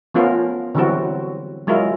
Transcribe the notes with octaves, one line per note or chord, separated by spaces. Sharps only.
F3 A3 B3 C#4 F4 A#4
D3 E3 F#3 G3 C4 F#4
F#3 G#3 E4 F4 A#4